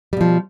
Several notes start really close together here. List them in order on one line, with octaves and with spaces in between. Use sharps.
G3 B2 F3